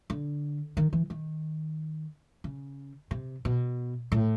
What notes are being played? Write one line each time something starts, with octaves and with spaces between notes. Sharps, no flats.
D3
D#3
E3
D#3
C#3
C3
B2
A2